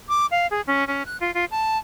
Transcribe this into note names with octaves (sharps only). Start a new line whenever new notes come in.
D6
F5
G#4
C#4
C#4
F#6
F4
F4
A5